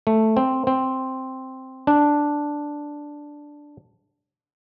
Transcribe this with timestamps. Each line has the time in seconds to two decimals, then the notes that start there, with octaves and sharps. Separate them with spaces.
0.07 A3
0.37 C4
0.67 C4
1.87 D4